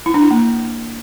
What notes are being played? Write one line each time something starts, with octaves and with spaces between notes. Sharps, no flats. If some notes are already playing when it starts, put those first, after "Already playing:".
E4
D4
E4
A#3